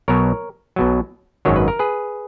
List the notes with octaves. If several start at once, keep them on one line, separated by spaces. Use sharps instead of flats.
B1 B2 F#3 A#4 C#5
B1 B2 F#3
G#1 F#2 D#3 F#3 C#5
B4
A#4
G#4 B4